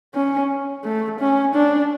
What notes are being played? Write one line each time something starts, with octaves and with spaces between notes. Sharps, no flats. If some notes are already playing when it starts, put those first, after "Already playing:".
C#4
A3
C#4
D4